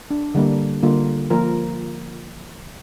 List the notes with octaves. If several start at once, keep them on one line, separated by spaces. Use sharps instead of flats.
D4
D3 G3 A#3 D4
D3 G3 A#3 F4
F3 A#3 F4 A#4